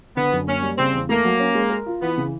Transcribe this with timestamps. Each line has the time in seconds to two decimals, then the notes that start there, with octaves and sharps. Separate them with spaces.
0.16 D3 B3
0.32 F#2
0.47 A#3 C#4
0.62 G3
0.78 C#3 C4
0.93 E2
1.09 A3 A#3
1.25 F#3
1.39 C#4
1.55 G#3
1.70 A#4
1.86 F4
2.01 E3 B3
2.17 C#3